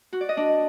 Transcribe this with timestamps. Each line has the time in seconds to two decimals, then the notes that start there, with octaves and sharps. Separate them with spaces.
0.13 F#4
0.21 D5
0.29 D#5
0.37 D4